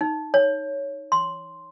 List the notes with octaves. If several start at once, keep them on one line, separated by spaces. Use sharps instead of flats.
D#4
C#5
C6